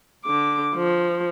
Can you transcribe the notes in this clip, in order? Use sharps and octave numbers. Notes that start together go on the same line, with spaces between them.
D3 D6
F3